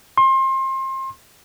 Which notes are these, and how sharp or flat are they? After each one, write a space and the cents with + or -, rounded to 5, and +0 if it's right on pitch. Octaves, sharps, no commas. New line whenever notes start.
C6 +30